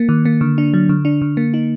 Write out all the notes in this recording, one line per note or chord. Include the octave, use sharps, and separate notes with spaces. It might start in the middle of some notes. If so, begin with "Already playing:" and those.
Already playing: A#3
D#3
A#3
D3
D4
F#3
D3
D4
D3
A#3
D#4